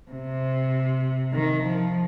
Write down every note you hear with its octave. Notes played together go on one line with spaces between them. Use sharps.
C3
D#3
F3